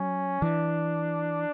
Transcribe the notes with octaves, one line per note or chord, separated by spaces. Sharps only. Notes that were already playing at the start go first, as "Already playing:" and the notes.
Already playing: F#3 C#4
E3 D4